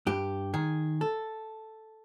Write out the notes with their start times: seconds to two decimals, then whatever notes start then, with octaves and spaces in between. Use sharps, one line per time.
0.07 G2 G4
0.54 D#3 G#4
1.01 A4